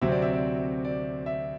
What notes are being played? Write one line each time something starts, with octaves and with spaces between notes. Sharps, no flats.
D2 C3 F#3 C4 E5
D5
E5
D5
D5
E5